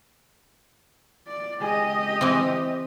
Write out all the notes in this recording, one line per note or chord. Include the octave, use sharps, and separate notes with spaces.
D5
C#2 G4 G#4 D#5
E3 C4